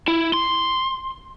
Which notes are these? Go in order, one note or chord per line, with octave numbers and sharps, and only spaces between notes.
E4
C6